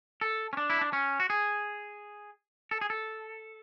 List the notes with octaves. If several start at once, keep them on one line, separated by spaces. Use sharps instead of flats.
A4
C#4
D4
E4
D4
C#4
F#4
G#4
A4
G#4
A4